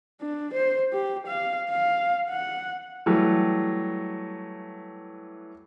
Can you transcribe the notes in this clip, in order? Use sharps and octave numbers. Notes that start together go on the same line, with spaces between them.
D4
C5
G4
F5
F5
F#5
E3 F#3 G3 A3